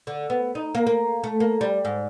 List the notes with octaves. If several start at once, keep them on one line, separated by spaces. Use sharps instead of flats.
D3
B3
D#4
A#3
A#3
A3
A#3
G3
G#2